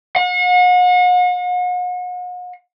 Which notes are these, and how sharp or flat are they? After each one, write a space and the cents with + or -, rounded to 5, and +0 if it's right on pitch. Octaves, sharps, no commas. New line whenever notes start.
F#5 -40